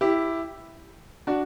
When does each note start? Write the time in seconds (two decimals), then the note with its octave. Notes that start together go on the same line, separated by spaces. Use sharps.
0.01 E4 G4
1.27 D4 F#4